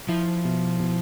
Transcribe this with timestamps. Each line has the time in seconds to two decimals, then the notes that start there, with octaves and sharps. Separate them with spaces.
0.09 F3 E4
0.45 B2
0.80 B2